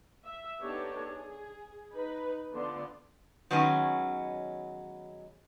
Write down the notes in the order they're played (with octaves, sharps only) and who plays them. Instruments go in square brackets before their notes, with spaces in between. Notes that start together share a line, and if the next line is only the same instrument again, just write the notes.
[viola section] E5
B3 D4 D#4 G4 A4 C#5
G#4
D#4 B4 B5
D3 F3 B3 D4 D5 C6
[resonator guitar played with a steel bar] D#3 F#3 G#3 B3 C#4